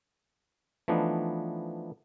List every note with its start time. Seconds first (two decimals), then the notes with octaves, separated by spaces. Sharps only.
0.88 E3 F3 A3 B3 D4 D#4